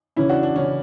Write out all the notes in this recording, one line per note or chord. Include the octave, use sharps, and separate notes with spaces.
C#3 E3 C#4 E4
D4 F#4
D4
C#3 E3 C#4